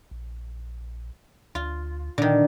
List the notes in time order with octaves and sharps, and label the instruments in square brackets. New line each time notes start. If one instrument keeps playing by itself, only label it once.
[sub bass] A#1
[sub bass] D2 [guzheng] F4
[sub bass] A#2 [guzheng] D3 D#3